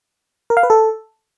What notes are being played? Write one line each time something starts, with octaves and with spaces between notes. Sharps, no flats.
A#4
F5
B4
A4